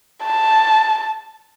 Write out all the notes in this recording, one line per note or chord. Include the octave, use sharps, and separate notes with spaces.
A5